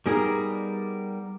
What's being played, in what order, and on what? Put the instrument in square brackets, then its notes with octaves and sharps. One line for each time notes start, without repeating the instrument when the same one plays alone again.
[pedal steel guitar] G3 A#4 [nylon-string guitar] B3 G#4 [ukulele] D#4